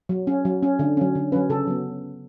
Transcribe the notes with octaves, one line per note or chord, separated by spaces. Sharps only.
F#3
C#4
F#3
C#4
D3
F#3 C#4
D3
F#3 C#4 B4
C#3 A4
F#3 B3